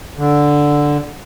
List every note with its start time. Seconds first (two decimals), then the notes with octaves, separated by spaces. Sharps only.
0.17 D3